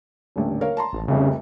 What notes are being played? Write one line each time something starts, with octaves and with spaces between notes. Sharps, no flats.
D#1 A1 D3
A#4 C#5 F5
A5 A#5 C6
A1
F1 C2 F2 C#3